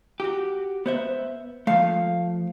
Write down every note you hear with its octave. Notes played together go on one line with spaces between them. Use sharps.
F#4 G4
B3 C5 E5
F3 A3 F5